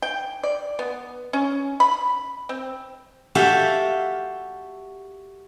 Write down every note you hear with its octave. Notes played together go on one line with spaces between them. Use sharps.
G5
D5
B3
C#4
B5
C4
F#4 G4 A4 E5 F5